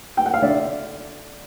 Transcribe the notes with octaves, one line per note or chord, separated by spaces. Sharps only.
G5
F#5
F5
D3 D5 E5